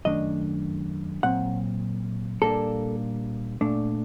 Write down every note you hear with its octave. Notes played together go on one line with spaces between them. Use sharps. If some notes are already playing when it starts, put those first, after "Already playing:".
F#2 D#3 A3 D4 D#5
A#2 F#3 C4 F#5
A#2 G3 A#3 D4 A4
A#2 A3 D4